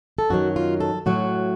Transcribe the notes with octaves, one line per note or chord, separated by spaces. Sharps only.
A4
F#2 D#3 F#3 F#4
F4
A4
A2 F#3 F#4